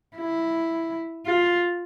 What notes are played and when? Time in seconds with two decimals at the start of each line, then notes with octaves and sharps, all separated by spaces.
0.17 E4
1.26 F4